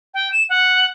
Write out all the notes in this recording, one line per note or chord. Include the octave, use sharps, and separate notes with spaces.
G5
E7
F#5